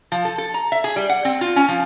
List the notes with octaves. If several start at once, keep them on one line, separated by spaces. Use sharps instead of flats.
F3
A4
A4
A#5
E5
G#4
G3
F#5
C4
F4
C#4
F3